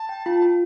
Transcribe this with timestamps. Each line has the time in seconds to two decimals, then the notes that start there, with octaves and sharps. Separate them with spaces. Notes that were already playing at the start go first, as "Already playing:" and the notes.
Already playing: A5
0.09 G5
0.26 F4
0.43 F4